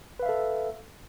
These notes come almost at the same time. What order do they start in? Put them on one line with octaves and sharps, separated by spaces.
B4 F5 E5 A4